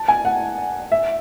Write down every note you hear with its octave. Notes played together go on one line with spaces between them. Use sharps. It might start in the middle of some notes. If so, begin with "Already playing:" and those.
Already playing: A5
G#5
F#5
E5